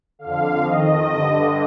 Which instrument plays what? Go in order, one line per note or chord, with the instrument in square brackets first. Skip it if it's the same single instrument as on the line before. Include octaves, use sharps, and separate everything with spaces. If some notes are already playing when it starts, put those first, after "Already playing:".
[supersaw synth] D3 F5
F2
F2 D#3 D#5
G2 D3